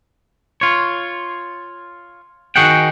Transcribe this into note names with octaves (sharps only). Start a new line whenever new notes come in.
F4 C#5
D#3 F#4 G#4 D#5 F#5 G5